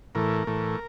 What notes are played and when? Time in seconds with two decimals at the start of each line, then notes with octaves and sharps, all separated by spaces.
0.15 A2 E3 A3 A#4
0.47 A2 E3 A3